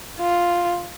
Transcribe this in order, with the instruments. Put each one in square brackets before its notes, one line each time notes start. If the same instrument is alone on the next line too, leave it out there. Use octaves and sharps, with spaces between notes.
[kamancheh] F4